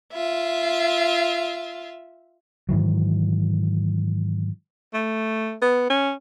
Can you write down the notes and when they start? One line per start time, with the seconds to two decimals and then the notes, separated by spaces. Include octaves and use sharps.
0.13 F4 E5
2.69 G#2 D#3 E3 F#3
4.94 A3
5.62 B3
5.90 C#4